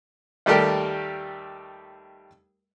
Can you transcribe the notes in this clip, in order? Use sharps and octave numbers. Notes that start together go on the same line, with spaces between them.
D#2 G3 A3 G4 A#4